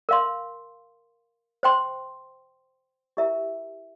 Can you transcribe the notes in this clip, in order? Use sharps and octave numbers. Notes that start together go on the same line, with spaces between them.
A#4 F5 C6
C5 G5 C6
E4 G4 A#4 E5 A#5